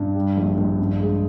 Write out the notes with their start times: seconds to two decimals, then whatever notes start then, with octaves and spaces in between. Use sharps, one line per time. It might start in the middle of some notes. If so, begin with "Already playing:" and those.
Already playing: G2
0.15 G3
0.37 A#1
0.58 A#1
0.80 G2
1.00 G#3